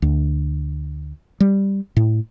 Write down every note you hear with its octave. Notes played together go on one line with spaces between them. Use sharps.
D2
G3
A2